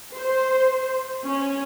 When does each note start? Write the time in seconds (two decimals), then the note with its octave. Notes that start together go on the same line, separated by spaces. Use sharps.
0.15 C5
1.26 C#4